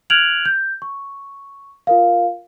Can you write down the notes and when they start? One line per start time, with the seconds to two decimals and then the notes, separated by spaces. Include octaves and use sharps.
0.10 F6 F#6 G#6 D7 F7 F#7
0.46 G6
0.82 C#6
1.87 F4 A#4 F5